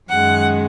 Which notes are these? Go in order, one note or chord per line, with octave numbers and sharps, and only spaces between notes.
F#2 D#3 G#3 F#5